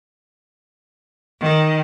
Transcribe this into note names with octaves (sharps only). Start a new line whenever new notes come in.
D#3